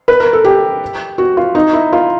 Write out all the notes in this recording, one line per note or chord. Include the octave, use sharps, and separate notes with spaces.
B4
A#4
A4
G4
F#4
F4
D#4
E4
F4